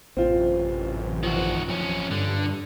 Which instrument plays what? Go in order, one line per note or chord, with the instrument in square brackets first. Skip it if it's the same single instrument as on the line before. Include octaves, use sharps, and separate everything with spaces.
[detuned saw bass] A1 [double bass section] F#2 C3 E3 [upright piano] C4 F4
[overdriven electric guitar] D#3 F#4 [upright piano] F3
[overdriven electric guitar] F2 C#4
[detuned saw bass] G2 [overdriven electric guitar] D3